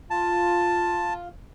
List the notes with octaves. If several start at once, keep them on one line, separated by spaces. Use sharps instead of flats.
F4 A5